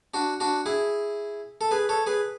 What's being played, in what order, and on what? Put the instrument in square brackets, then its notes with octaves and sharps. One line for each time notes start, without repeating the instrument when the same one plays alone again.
[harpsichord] D4 F#4
D4 F#4
E4 G#4
A4
G#4 B4
A4 C#5
G#4 B4